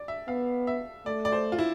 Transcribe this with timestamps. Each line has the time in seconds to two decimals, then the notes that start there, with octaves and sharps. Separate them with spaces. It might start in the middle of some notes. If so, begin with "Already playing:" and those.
Already playing: D5
0.08 E5
0.28 B3 F5
0.67 E5
1.06 A3 D5
1.25 D5
1.32 C5
1.52 F4
1.59 E4